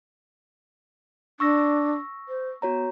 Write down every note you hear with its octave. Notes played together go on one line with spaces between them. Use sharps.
D4 C#6 E6 A#6
C5
B3 F#4 C#5 A#5